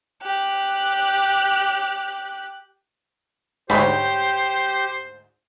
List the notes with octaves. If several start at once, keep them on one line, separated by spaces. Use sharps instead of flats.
G4 F#6
D2 G#2 G4 C5 C#5 B5